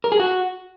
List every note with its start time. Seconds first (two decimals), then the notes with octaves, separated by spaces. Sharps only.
0.04 A#4
0.12 G#4
0.20 F#4